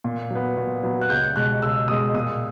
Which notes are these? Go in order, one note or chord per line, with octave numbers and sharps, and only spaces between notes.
A#2
F#3 B3
A#2
F#3 B3
F#6
C#2 G6
B2 G#3 F#6
C#2 E6
B2 G#3 D#6
A#2 D#6